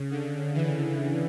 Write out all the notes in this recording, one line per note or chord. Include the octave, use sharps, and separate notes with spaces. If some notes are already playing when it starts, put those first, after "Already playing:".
Already playing: C#3
D3
D3 E3